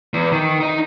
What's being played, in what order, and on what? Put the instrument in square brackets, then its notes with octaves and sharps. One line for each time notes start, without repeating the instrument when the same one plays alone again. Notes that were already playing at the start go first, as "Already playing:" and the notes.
[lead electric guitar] E2
D#3
D#4 D#5